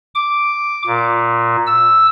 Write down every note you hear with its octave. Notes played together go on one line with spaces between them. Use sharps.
D6
A#2
E6